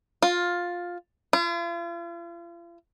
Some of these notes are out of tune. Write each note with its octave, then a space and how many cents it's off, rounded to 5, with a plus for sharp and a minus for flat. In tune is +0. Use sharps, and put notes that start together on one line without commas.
F4 +10
F4 -40